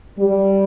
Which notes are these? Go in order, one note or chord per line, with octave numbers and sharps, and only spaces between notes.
G3